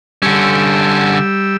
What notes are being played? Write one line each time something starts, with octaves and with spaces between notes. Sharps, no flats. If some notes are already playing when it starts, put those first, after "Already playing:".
D3 G3 C#4 E6